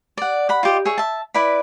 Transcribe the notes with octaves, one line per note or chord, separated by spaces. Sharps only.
D5 F#5
F#5 B5
F4 G4 D#5
G#4 C#5 E5
E5 A5
E4 B4 D5 B5